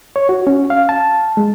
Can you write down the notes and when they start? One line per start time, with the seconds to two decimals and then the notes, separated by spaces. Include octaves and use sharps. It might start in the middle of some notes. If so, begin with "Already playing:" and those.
0.16 C#5
0.29 F#4
0.47 C#4
0.70 F5
0.89 A5
1.37 G#3